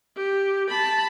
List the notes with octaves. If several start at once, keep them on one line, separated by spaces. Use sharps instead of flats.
G4
A5 B5